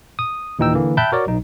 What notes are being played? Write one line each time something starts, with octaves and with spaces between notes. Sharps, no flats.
D#6
D#2 A#2 E3 D#4 G5 E6
D3 E3 A#3
E5 G5 A5 B5 F#6 G6
F#4 A#4 C#5 D5
B1 D#4